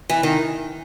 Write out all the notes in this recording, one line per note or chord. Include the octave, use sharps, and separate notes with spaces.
E3
D#3